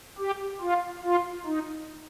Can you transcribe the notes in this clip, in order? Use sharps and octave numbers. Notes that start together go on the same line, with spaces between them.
G4
F4
F4
D#4